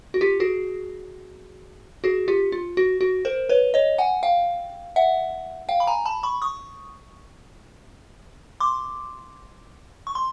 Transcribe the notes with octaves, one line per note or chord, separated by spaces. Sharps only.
F#4
F4 G4
F#4 G#4
F#4 G#4
F4 G4
F4
F#4
F#4
A#4 C5
B4 C#5
C#5 D#5
F#5 G#5
F5 G5
E5 F#5
F5 G5
B5
G#5 A#5
A5 B5
B5 C#6
C#6 D#6
C6 D6
C#6
C6